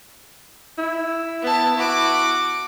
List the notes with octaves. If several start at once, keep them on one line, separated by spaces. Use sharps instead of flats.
E4
B3 A5
F#4 D6